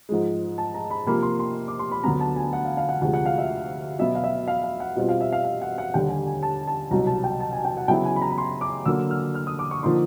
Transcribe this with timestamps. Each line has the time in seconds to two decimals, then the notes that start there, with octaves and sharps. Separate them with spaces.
0.09 G#2 F3 G#3
0.58 A5
0.74 A#5
0.91 B5
1.06 C3 F3 A#3 B5
1.23 C6
1.39 C6
1.68 D6
1.79 C6
1.91 B5
2.04 D2 D3 F#3 B3 A#5
2.20 A5
2.36 G#5
2.53 F#5
2.65 F5
2.77 F5
2.89 F#5
3.01 D2 C3 F3 G#3 F#5
3.14 F#5
3.26 F5
3.38 E5
3.99 B2 F#3 B3 E5
4.15 F5
4.24 E5
4.48 F5
4.64 F5
4.80 F#5
4.96 B2 G3 C4 F4
5.09 F5
5.21 E5
5.32 F5
5.44 F5
5.62 F#5
5.78 F#5
5.93 D#2 D3 G3 G5
6.09 G#5
6.27 G#5
6.43 A5
6.67 A5
6.91 C2 B2 F#3 A#5
7.07 A5
7.24 G5
7.40 A5
7.53 G#5
7.65 G5
7.77 F#5
7.88 C#3 F#3 B3 E4 G5
8.05 G#5
8.16 B5
8.22 A#5
8.30 B5
8.38 C6
8.61 D6
8.85 D3 F#3 A#3 E6
9.10 F6
9.35 F6
9.47 D#6
9.59 D6
9.71 C#6
9.83 D3 F3 A#3 D#4 C6